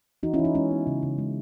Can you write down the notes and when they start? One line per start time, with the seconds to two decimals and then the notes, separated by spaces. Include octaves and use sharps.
0.23 E3 D#4 F#4
0.34 C#4 E4
0.39 E3
0.44 D#4
0.55 G#3 C#4
0.71 B3
0.87 C#3
1.03 C#3
1.18 G#3